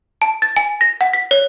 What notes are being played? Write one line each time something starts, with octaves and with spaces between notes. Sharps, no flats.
A5
A6
G#5
A#6
F#5
B6
C#5